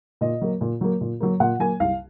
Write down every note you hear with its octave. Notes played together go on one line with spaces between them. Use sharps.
A#2 D#5
F#3 A#3
A#2
F#3 A#3
A#2
F#3 A#3
A#2 F#5
F#3 A#3 G#5
C2 F5